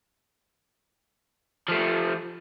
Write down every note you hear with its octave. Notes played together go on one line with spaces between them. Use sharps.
F3 A3